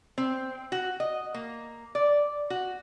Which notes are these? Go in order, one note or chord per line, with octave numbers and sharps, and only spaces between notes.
C4
F#4
D#5
A#3
D5
F#4